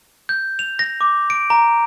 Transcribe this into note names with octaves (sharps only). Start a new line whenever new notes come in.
G6
F7
A#6
D6
D7
A#5